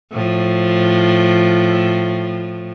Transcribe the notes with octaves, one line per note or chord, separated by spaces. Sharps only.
A2 F3